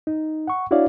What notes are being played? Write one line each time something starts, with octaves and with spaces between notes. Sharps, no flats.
D#4
F#5 C#6
D4 E4 F#4 C#5 D5 F5